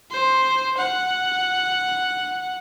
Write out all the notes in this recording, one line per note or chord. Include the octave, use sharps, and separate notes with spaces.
C5
F#5